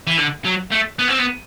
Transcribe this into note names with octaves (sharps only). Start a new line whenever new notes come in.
E3
D3
F#3
A3
B3
C4
B3